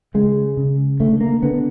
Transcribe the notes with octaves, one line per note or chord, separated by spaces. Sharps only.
C#3 G#3
C#3
D3 A3
A#3
D3 B3